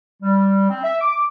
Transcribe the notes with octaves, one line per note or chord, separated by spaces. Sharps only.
G3
C4
E5
D6